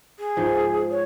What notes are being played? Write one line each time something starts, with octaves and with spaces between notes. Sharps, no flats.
G#4
G#2 F3
C#5